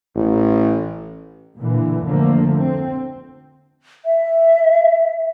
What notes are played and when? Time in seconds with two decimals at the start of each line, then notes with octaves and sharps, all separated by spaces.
0.16 A1
1.58 A#2 D3 E3
2.06 F2 D3 F3 A3 A#3
2.59 C4
4.05 E5